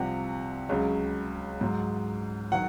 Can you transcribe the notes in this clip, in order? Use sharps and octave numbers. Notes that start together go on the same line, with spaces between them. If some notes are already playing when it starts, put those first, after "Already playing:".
Already playing: C2 C3 F3 F#5
C#2 C#3 F#3
G#2 F#3
D#3 F#3 F#5